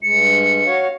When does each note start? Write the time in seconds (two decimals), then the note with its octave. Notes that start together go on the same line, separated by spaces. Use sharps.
0.03 G2 G#3 C#7
0.66 F#4 C#5 F5